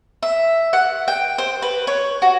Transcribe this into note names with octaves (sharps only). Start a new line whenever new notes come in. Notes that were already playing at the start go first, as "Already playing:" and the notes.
E5
F#5
G5
C5
B4
C#5
F#4